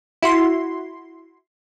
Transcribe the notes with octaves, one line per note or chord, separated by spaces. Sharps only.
E4 F#4 C6